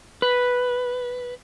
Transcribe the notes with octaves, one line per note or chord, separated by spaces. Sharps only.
B4